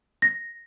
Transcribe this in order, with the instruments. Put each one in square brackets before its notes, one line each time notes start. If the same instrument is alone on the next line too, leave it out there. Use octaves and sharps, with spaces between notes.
[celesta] A#6